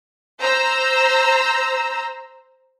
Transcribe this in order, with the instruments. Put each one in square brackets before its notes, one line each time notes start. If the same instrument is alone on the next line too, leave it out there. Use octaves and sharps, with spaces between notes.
[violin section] C5 A#5 E6